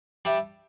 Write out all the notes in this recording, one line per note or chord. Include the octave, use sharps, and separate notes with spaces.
G3 D4 G4 E5